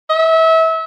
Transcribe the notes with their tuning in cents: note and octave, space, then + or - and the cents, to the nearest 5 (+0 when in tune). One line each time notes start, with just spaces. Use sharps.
E5 -30